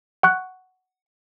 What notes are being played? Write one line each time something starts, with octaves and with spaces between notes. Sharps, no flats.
F#5 C#6 F#6